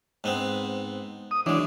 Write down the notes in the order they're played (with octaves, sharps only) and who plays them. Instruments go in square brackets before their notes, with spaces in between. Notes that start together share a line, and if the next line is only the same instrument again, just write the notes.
[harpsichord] G#2 B3 C4
[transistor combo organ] D#6
[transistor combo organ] E3 D4 [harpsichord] F#3 G#3